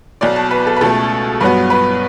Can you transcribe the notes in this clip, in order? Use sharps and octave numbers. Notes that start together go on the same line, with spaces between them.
B1 B2 F#3 D5
A5
B4
A4
B4
C#2 B2 A3 A4
G2 F#3 B3 B4
B4